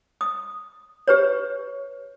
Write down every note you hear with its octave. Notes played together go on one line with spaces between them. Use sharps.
D#6
G4 B4 C#5